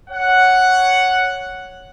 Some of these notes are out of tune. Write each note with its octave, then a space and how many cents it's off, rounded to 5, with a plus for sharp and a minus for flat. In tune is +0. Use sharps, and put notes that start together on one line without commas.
C#5 +0 F#5 +0